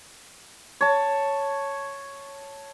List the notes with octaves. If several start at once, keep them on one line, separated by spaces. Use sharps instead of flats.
C#5 A5